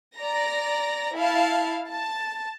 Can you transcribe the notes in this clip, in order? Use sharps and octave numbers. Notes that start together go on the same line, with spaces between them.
D5 A#5 A#6
E4 F5 A5
A5